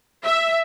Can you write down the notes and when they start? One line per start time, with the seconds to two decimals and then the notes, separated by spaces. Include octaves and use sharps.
0.23 E5